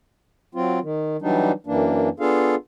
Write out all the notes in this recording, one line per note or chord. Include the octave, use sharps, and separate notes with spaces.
F#3 C4 F4
D#3
E3 F#3 G3 D4 D#4
F#2 E3 A#3 D4
B3 D4 F4 G#4 A4 F5